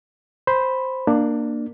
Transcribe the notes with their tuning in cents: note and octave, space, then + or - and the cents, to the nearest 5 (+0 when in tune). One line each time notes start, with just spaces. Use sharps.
C5 +0 B5 +0
A#3 +0 D4 +20